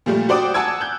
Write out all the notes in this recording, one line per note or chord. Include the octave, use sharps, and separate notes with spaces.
A#2 F3 G3 A3
F#4 C5 D5 G5 D6 D#6
F#5 G#5 A5 E6 G#6 D7
F#6 G6